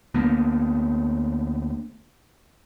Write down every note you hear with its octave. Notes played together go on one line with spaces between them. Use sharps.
D2 A#3 B3